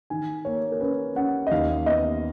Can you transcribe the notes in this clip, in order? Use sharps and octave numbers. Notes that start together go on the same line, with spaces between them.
D#3 G#5
A#3 C#5
A#4
C#4 B4
C#4 F#5
D#5
D#2 F5
B3 D#5